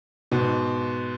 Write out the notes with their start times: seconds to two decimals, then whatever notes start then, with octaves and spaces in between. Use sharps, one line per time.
0.31 G#2 B2